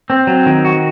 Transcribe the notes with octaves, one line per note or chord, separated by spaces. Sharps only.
C4
F#3
D#3
F#4